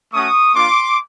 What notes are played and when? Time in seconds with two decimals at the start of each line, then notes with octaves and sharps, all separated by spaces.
0.13 A3 C#4 F#4 C#6 D#6
0.55 A#3 D4 F4 C6 D6